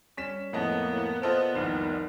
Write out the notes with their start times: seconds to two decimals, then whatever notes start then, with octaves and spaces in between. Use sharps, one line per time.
0.17 G3 C#4 B6 E7
0.53 F2 A2 A#3 B3 D#5 A5
0.89 A2
1.22 A#2 B3 F4 A4 C5 D#5
1.55 F1 C2 D#3